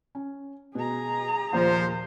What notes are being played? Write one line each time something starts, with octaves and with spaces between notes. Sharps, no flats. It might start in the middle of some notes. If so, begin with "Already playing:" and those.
C#4
B2 G#4 A#5
D#2 A#2 F3 A#3 C5